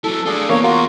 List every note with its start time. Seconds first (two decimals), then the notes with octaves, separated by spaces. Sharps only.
0.04 F#3 E4 A4
0.26 A3 D4 F4 G#4 A4
0.49 E2 A#3 C#5
0.63 F4 F#4 A#4